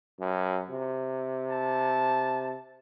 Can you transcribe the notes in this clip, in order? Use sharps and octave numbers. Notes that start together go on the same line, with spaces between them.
F#2
C3
A5